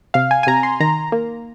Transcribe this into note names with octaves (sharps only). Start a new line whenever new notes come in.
C3 F5
G#5
G#5
C3 A#5
C6
D#3 A#5
A#3